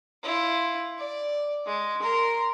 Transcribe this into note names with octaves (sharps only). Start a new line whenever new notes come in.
E4 F4
D5
G#3
A#4 C6